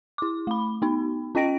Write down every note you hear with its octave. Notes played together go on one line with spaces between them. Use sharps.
E4 D6
A3 B5
B3 D#4
C#4 F4 D#5 G5 A#6 D7